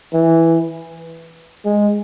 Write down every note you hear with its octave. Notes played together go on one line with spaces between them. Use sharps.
E3
G#3